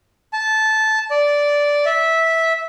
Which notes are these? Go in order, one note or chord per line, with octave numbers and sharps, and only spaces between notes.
A5
D5
E5